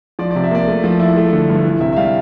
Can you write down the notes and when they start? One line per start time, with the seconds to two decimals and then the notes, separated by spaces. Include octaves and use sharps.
0.19 F3 D5
0.31 D5
0.35 C3
0.44 E5
0.51 A#3 D5
0.68 A3
0.84 F3
1.00 E4
1.16 A3
1.33 D3
1.49 G2
1.65 E3
1.81 C3 E5
1.93 E5
1.97 G3 F5